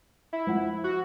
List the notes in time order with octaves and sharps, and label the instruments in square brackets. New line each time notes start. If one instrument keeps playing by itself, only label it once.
[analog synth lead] E4
[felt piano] F3 F#5
[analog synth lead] F#4